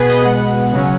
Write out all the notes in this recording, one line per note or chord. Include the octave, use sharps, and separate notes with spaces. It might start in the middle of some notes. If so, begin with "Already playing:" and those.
Already playing: B2 B3 G#4 B4
D#5
B2 G#3 B3 F#5
C#3 F#3 C#4